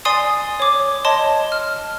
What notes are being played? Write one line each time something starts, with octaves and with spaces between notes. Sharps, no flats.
D5 G#5 C6 D#6 C7
C#5 D6
C#5 D#5 A5 C6
F6